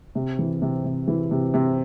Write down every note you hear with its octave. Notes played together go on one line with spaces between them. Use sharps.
C3
E3
C3
C3
E3
C3
C3